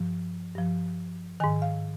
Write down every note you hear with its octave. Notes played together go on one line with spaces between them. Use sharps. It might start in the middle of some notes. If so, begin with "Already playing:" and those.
Already playing: G2 F3
G2 F3
G#2 D#3 G#5
F5